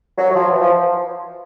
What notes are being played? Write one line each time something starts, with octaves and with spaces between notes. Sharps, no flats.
F#3
F#3
F3
E3
F3